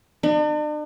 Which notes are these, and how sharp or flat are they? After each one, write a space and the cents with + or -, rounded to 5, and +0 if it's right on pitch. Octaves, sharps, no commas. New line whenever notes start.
D4 +45